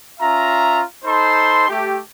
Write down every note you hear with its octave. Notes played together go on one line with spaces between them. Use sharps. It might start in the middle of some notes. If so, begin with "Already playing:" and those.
C#4 F4 E5 A#5
D#4 A4 C5 B5 C6
A3 G4